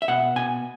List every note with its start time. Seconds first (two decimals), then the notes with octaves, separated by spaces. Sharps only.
0.02 E5
0.08 B2 F#5
0.36 B2 G#5